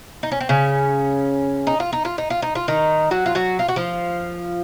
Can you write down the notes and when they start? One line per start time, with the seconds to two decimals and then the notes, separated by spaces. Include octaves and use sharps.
0.23 D#4
0.32 C#4
0.41 C4
0.49 C#3 C#4
1.67 D#4
1.80 F4
1.93 D#4
2.05 F4
2.18 D#4
2.30 F4
2.42 D#4
2.55 F4
2.68 D#3 D#4
3.11 F#3 F#4
3.26 F4
3.35 F#3 F#4
3.59 F4
3.68 F#4
3.76 F3 F4